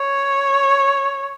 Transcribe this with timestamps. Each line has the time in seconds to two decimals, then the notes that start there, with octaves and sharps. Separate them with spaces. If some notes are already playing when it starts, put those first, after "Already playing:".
Already playing: C#5